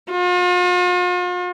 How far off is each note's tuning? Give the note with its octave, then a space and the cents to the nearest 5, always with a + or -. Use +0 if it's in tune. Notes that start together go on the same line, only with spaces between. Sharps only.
F4 +45